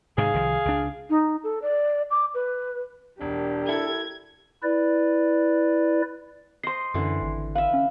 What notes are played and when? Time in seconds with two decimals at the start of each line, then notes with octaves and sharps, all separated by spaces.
0.18 G#2 C3 D#3 G#4 F5
0.34 C2 D#3 F3
0.65 C#2 D4
1.10 D#4
1.44 A4
1.62 D5
2.11 D6
2.34 B4
3.21 E1 D4 G4 A#4
3.68 E4 A4 G#6
4.63 E4 B4 D5
6.64 C5 D#5 C6 C7
6.94 F#2 D3 E3
7.22 G#1
7.55 B4 E5 F5
7.74 C#4